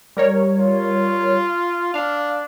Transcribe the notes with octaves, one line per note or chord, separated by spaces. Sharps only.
G3 A#4 C#5
F4
D4 F5